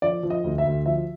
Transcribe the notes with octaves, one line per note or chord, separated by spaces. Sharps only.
F3 D5
F3
D#5
D2
E5
D2
F3 E5